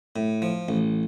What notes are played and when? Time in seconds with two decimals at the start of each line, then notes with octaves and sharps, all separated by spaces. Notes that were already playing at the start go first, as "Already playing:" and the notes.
0.16 A2
0.42 F3
0.69 A1